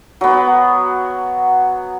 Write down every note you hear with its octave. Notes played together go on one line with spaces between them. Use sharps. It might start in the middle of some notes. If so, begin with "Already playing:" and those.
F#3 B3